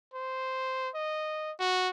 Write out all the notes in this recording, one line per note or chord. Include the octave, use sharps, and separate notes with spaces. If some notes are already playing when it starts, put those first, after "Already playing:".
C5
D#5
F#4